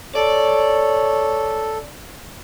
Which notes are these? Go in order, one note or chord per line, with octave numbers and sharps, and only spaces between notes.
A4 C#5 D5